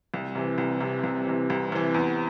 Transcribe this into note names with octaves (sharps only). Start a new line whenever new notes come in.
C2
C3 E3
C2
C3 E3
C2
C3 E3
C2
C3 E3
E2